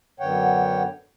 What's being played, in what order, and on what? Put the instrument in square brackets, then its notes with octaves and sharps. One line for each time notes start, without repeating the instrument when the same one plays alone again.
[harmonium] F#2 D3 B3 C#5 F#5 G5